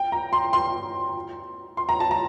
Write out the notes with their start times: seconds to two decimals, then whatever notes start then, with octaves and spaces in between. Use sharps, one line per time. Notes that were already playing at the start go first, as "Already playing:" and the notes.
Already playing: G5
0.12 A#5
0.33 C6
0.53 C6
1.77 C6
1.89 A#5
2.00 A5
2.11 A#5